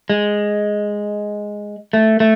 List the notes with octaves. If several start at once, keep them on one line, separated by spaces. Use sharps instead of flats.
G#3
A3
A3